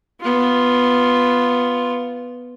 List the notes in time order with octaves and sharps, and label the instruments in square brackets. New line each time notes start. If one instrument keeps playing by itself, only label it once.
[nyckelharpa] B3 F4